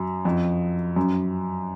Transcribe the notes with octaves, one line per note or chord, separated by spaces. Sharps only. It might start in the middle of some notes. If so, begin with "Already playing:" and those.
Already playing: F#2
F2
F#2